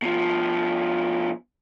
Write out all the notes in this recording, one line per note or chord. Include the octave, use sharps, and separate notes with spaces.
B2 F3